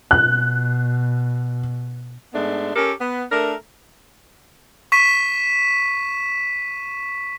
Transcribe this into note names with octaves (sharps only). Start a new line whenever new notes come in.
B2 F#6
G#2 G#3 A3 B3 D4
C#4 G4 A4 A#4
B3
A3 D4 A#4
C#6 B6 D#7